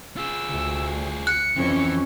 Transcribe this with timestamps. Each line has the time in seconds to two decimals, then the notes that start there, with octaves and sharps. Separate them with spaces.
0.17 F4 G#4 E6
0.50 D2
1.27 F#6 C#7
1.56 F2 E3 C#4